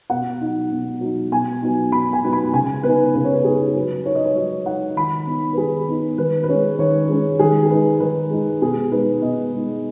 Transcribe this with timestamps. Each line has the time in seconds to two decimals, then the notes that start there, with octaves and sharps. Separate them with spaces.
0.10 B2 F#5
0.41 F#3 D#4
0.72 B2
1.01 F#3 D#4
1.32 B2 G#5
1.62 F#3 B3 D#4
1.92 B2 B5
2.13 G#5
2.23 F#3 B3 D#4
2.33 B5
2.53 C#3 G#5
2.83 B3 D#4 B4
3.14 C#3 B4
3.24 C#5
3.34 B4
3.44 B3 D#4 G#4
3.75 F#3 B4
4.05 D#4 C#5
4.15 D#5
4.26 C#5
4.36 F#3 D#5
4.66 D#4 F#5
4.97 D#3 B5
5.27 B3 D#4
5.53 B4
5.57 D#3 G#4
5.88 B3 D#4
6.18 D#3 B4
6.43 B4
6.49 G#3 C#4 C#5
6.79 D#3 C#5
7.09 G#3 C#4
7.39 D#3 G#4
7.65 G#4
7.70 G#3 D#4 B4
8.00 D#3 B4
8.30 G#3 D#4
8.62 B2 G#4
8.91 G#3 B3 D#4 B4
9.22 B2 D#5
9.53 G#3 B3 D#4